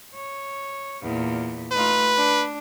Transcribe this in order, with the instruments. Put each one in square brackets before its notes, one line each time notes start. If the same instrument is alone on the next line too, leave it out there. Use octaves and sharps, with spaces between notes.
[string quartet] C#5
E2 A#2
[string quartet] A3 D#4 F4 [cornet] B4
[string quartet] D4